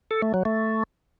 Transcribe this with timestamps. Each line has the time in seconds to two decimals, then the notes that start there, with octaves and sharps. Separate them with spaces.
0.11 A4
0.22 A3
0.34 F#3
0.45 A3